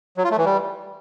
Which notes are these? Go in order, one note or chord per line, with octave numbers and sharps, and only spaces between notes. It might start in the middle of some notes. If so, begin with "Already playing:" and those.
F#3
F4
A3
E3
G3